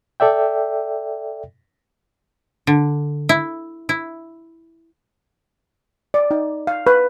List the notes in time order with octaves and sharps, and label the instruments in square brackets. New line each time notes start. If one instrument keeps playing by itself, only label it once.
[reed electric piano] A4 D5 E5 G5
[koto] D3
E4
E4
[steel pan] D5
D#4
F5
B4